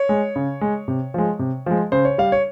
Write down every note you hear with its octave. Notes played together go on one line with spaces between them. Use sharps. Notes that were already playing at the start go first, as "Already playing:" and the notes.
Already playing: C#5
G#3
C#3
G#3
C3
F3 G#3
C3
F3 G#3
C#3 C5
C#5
G3 F5
C#5